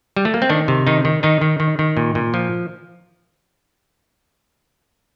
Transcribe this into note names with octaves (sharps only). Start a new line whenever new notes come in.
G3
A3
A#3
C4
D#3 D4
C3
D#3 D#4
D#3
D#3 D#4
D#3
D#3
D#3
A#2
A#2
F3